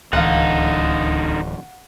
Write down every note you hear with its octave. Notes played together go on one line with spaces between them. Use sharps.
D1 C#2 D3 E3 D#4 F5 F#5